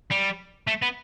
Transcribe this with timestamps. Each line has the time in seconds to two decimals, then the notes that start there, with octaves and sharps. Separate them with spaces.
0.11 G3
0.67 A3
0.82 B3